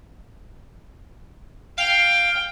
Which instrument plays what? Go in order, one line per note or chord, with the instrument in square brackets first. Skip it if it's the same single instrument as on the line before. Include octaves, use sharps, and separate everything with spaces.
[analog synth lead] F5 [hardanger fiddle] G5